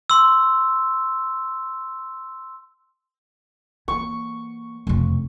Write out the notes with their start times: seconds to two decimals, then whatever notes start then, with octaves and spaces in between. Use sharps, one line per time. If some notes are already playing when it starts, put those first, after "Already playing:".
0.10 C6 E6
3.88 E3 A#3 C#6
4.87 E1 F2 C3 A3 C4